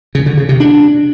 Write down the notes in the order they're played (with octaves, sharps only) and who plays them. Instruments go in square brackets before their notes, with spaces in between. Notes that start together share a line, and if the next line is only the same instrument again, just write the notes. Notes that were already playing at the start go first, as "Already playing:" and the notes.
[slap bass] C#3
D3
C#3
C3
D4